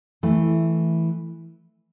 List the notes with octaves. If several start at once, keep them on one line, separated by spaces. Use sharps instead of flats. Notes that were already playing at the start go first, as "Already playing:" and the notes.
E3 A3